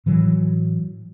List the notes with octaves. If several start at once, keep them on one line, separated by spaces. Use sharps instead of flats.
A2 E3 F#3